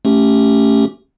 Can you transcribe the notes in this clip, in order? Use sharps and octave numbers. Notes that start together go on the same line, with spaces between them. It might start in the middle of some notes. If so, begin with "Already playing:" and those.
A3 C#4 G4